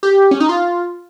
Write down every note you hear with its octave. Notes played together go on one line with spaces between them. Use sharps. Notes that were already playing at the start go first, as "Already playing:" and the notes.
G4
C#4
D#4
F4